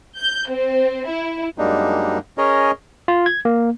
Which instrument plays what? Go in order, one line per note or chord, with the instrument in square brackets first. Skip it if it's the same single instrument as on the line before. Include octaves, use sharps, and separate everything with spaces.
[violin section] G6
C4
E4
[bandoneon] F#2 G3 G#3 A#3 D4 D#4
C#4 G#4 A#4 C#5 D#5
[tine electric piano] F4
G#6
A#3